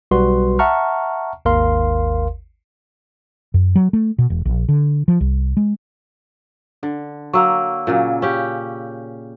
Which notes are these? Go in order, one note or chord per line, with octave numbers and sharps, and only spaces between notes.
B1 G3 F#4 B4 C6
E5 F#5 A5 A#5 C#6 F6
G#1 D#2 A#4 F5 C6
F#2
F#3
A3
B2
E1
A#1
D3
F3
C2
G#3
D3
F#3 A#3 A#4 C#6 E6
A#2 C#3 F#3
C#4 G4